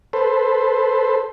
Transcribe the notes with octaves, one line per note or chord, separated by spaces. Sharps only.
A4 B4 C5